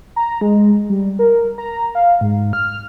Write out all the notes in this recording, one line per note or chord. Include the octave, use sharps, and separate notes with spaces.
A#5
G#3
G3
A#4
A#5
F5
G#2
F6